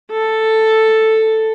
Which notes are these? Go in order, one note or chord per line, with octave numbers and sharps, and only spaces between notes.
A4